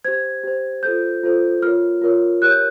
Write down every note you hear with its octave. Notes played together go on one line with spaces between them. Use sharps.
G4 C5 G#6
G4 C5
F4 A4 C5 G6
F4 A4 C5
F4 A#4 C#5 F6
F4 A#4 C#5
G4 A#4 C#5 F#6
G6